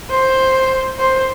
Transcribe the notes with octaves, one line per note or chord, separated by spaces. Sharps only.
C5
C5